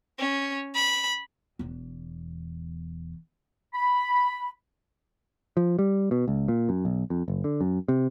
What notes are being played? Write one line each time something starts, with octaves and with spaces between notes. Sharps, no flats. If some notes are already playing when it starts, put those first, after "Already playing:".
C#4
B5
E1 E2
B5
F3
G3
B2
C#2
A#2
F#2
B1
F2
F#1
D3
F#2
C3